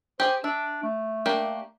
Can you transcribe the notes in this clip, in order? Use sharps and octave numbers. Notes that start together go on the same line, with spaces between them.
G4 G#4 C5
D4 E5
A3
A#3 D4 G4